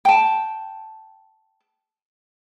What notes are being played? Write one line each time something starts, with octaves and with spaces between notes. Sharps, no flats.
G5 A5